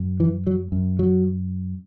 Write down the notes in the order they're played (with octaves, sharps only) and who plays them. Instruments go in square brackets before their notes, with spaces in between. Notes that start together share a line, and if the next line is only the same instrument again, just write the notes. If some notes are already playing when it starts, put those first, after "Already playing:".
Already playing: [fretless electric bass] F#2
E3
F#3
F#2
F#3